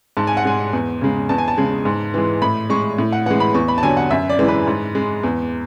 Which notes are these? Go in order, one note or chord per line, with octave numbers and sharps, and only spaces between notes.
G#2 A5
G#5
F#5
G#3 G#5
E2
C#3 G#3
E2 A5
G#5
A5
C#3 G#3
G#2
E3 G#3
A2 B5
G#3 C#6
A2
F#5
E3 G#3 F#5
B5
E2 C#6
B5
A5
D3 F#3 G#5
F#5
F#2 E5
D5
E3 G#3
B4
G#2
G#3
E2